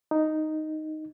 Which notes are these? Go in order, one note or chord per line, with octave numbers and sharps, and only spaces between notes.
D#4